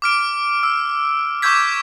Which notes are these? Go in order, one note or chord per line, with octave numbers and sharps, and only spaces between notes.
D6 F6 D7
E6
C#6 D6 E6 G6 G#6 B6